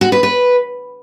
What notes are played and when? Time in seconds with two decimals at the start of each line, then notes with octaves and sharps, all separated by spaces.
0.01 F#4
0.12 B4
0.23 B4